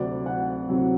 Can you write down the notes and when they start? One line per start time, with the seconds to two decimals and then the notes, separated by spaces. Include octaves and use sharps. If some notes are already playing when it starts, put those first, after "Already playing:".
Already playing: D2 C3 F#3 C4 D5
0.26 F#5
0.68 D2 C3 F#3 C4